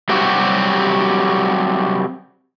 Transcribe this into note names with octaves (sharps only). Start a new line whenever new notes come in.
F#3 G3 C4 F#4 G4